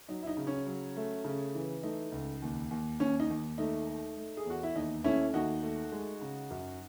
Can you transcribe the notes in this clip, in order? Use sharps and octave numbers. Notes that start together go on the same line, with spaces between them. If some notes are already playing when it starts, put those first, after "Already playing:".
F#3 D#4
E4
D#4
C#3
C#4
F#3
A3
C#3
E3
A3 D#4
C#2
D#2
D#2
D#2 C#4
D#4
D#2
A3 D#4
A3
A3
G#4
E2 F#4
E4
D#2 D#4
A3 C#4 E4
D#2 D#4 F#4
A3
G#3
C#3
F#2